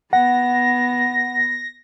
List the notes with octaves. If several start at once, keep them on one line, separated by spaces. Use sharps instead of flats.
B3 F#5 A#6